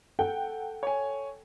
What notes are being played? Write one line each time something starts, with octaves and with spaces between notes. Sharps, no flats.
A4 F#5 G5
C#5 G#5